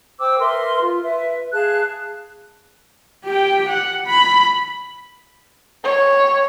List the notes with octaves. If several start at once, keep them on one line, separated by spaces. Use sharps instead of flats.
C5 G5 D6 E6
A#4 B4 E5 C6
F4
B4 E5
G#4 F5 A5 F#6
G4 G5
F#5
B5
C#5